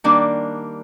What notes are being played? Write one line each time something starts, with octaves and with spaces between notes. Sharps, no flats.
D#3 G3 A#3 D4